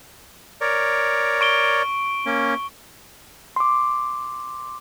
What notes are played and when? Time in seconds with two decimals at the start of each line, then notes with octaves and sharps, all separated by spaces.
0.61 A#4 C#5 D5
1.41 C#6 D7 G7
2.26 A#3 C#4
3.56 C6 D6